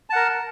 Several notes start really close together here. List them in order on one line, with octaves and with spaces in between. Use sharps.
A5 F#5 A#4